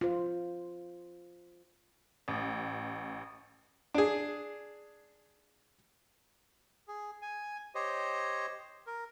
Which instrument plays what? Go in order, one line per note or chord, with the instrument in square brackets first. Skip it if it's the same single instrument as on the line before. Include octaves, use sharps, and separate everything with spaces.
[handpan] F4 C5
[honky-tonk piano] A1
[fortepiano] D4 G#4
[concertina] G#4
G#5
G4 C5 C#5 D#5
A#4